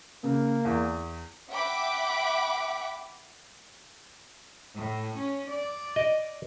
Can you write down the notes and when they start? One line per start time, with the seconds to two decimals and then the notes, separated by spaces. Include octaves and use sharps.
0.24 C#3 A#3
0.65 E2
1.52 E5 F#5 G5 B5 D6
4.74 A2
5.16 C#4
5.49 D5
5.96 D#5